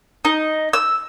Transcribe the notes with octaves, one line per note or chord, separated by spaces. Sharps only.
D#4
E6